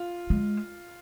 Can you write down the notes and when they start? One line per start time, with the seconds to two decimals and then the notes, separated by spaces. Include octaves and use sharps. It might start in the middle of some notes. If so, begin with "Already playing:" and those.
Already playing: F4
0.30 G#3